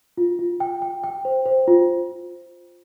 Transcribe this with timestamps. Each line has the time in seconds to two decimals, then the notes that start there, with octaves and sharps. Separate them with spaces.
0.18 F4
0.39 F4
0.60 G5
0.82 G5
1.04 G5
1.25 C5
1.46 C5
1.68 F4